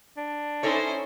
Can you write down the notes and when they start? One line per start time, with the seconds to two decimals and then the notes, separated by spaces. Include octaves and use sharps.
0.17 D4
0.63 C#4 D#4 E4 A4 C5 C#5